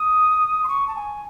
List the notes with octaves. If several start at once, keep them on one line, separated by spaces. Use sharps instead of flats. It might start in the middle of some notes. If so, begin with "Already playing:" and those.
Already playing: D#6
C6
C#6
A5
G#5